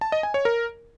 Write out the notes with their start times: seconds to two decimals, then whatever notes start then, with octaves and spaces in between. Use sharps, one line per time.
0.01 A5
0.12 D#5
0.23 G#5
0.34 C#5
0.45 A#4